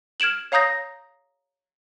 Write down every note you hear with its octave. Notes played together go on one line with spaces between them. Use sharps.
F6 G#6 D7 E7 F#7
C#5 F5 A#5 D#6 G6 A#6